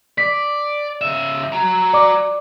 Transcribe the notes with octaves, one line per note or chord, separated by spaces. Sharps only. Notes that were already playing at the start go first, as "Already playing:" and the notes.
D5 B6
C#3 E5 E7
F#4 A#5
D5 D6